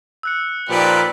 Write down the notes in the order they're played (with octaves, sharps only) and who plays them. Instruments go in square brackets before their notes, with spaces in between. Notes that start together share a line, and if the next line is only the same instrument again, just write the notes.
[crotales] E6 F#6 C#7
[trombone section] A#2 F3 [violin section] D#4 G4 D5 [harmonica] B4